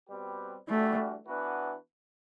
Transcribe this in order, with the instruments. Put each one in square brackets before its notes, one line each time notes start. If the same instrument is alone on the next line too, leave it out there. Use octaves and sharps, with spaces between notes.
[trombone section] B2 G3 C4 G4 B4
[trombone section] E3 G3 D4 F#4 [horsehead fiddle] A3
[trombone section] E3 B3 D4 F#4 B4